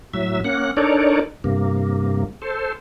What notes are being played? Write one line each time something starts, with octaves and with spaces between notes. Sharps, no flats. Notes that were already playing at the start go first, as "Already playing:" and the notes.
A2 F#3 E5
A#3 C#4 F#5
D4 D#4 A4 A#4 C#5 D5
G2 C3 A#3
A4 C5